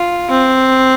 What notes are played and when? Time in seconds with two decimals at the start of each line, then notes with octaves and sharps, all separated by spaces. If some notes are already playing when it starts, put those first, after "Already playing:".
Already playing: F4
0.30 C4